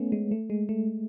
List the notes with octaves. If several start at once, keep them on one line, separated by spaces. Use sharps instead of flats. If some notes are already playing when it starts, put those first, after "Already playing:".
Already playing: A3 B3 C#4
G#3
A3
G#3
A3